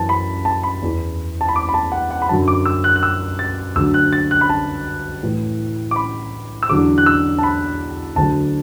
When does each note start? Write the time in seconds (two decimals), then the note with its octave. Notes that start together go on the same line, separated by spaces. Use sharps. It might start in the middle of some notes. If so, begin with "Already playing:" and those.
Already playing: F#2 E3 A5
0.09 B5
0.45 A5
0.63 B5
0.82 E2 E3
1.41 A5
1.48 B5
1.56 D6
1.69 B5
1.74 A5
1.92 F#5
2.11 F#5
2.22 B5
2.29 F#2 D3 F#3 A5
2.48 D6
2.66 E6
2.84 F#6
2.96 F#6
3.03 E6
3.39 A6
3.76 D2 D3 F#3 E6
3.94 F#6
4.13 A6
4.31 F#6
4.41 B5
4.49 A5
5.23 A2 E3
5.91 D6
5.96 B5
6.63 E6
6.69 E2 D3 F#3 D6
6.98 F#6
7.06 E6
7.38 A5
7.43 B5
8.16 D2 D3 F#3 A5